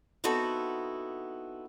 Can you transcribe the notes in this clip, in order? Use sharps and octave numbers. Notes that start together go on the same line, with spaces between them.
B3 C4 D#4 E4 F#4 A4